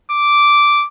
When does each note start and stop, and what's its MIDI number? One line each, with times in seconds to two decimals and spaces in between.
0.12 0.86 86